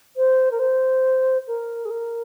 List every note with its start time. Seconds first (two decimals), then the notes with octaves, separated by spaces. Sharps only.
0.17 C5
0.51 A#4
0.59 C5
1.48 A#4
1.85 G#4
1.91 A#4